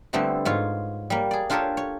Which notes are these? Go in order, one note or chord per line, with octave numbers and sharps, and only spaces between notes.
D3 G3 A3 B3 C4 E4
G#2 F4 C#5
G3 A#3
G#4 D5
D4 F4 G4 A4 A#4 C#5
C#5